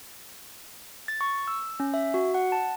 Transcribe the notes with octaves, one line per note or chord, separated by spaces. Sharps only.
A6
C#6
E6
C#4
E5
F#4
F#5
A5